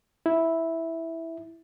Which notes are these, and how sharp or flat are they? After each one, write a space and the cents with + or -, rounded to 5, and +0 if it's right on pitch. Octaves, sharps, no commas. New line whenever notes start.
E4 -5